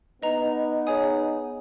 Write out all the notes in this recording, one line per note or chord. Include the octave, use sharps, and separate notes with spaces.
B3 D#4 B4 D#5 A#5
G#4 C#5 G#5 D#6